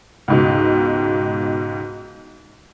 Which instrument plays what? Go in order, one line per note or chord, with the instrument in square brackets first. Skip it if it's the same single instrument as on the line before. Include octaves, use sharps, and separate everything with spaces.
[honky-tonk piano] C#2 G#2 B2